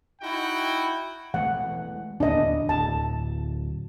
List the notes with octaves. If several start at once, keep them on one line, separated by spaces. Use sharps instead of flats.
D#4 E4 F#4 G5
E3 G#3 A3 F#5
D1 D#2 B3 D4 D#5
D1 A5